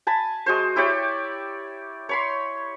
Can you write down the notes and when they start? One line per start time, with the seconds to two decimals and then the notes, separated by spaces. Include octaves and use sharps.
0.07 G#5 A5 B5
0.46 G#3 F#4 C5
0.76 E4 G4 C#5 D5
2.09 C#5 B5 C6